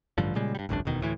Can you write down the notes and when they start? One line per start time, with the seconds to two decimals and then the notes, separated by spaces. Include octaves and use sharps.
0.18 A1 G2 D3 F3
0.35 A#2 C#3 G3 G#3
0.55 G2 G3
0.69 G#1 C#2 F#2 D4
0.85 E1 D2 B2 D#3
1.01 D2 A2 E3